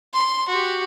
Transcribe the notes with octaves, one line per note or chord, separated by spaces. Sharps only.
C6
F#4 G4